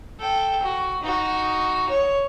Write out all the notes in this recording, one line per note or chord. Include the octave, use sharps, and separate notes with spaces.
A4 G5
F#4
D#4 F#4
C#5